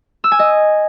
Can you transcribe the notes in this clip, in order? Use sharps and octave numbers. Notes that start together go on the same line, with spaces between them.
E6
G#5
D#5